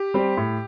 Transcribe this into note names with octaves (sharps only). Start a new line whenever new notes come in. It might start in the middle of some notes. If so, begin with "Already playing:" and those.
Already playing: G4
G3 C4
A2